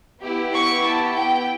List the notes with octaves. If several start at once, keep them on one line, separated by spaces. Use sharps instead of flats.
B3 E4 G4
C#6
A5
G5